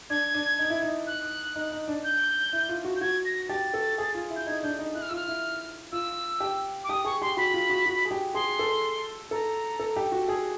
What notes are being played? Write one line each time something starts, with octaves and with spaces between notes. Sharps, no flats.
D4 G#6
D4
D#4
E4
D#4
F#6
D#4
D#4
D4
G6
E4
F4
F#4
G6
F#4 G#6
A#6
G4 A6
A4
G#4
F4
E4
G6
D#4 G#6
D4 G6
D#4
E4 F#6
F6
F4 E6
F6
E4
F4 E6
G4
D6
G4 D#6
G#4 C#6
G4 C6
F#4 B5
F4
F#4
F#4
G#4
G4
G#4 C6
A4
A4 A#5
A4
G4
F#4
G#4